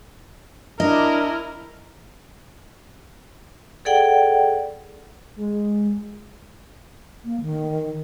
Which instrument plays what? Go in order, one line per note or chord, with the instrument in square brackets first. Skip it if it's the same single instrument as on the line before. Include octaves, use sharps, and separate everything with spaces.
[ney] D4 [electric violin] E4 A#4 [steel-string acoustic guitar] D#5
[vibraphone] G#4 A4 D5 F#5 G5
[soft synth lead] G#3
[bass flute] A#3
D#3